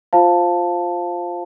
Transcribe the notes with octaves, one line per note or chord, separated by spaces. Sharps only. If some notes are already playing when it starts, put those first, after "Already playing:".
F4 C5 F5 A5